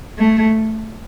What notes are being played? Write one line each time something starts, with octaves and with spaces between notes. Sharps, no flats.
A3